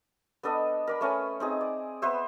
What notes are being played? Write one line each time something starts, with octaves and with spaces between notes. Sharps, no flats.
B3 D4 A4 D#5
A#4 D5 B5
A3 C#4 B4 G#5
C4 D#4 G#4
D5
B3 B4 C5 E5